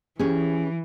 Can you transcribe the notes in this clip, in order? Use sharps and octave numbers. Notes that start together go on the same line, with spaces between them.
E3 C#4 G4 G#4